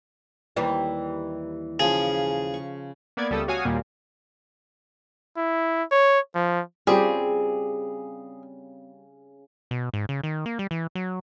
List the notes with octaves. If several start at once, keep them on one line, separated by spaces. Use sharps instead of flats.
D#2 E3 G3
C#3 F3 C#4 G#4
C#6
A#3 B3 D5 G#6
C#2 G3 A3 A4 D#6 E6
F#4 C#5 F5 G#5 D#6
D#2 A#2 G3 A#3
E4
C#5
F3
C#3 G3 C4 F4 G4 G#4
B2
G#2
C#3
D#3
A#3
G3
E3
F#3